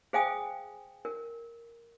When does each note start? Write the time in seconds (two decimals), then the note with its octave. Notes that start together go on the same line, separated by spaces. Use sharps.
0.13 G#4 C5 F5 G5 G#5 D#6
1.05 A#4